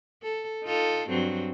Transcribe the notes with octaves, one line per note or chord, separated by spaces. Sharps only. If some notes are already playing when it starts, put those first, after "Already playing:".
A4
D#4 F4 A4
G2 F#3 C4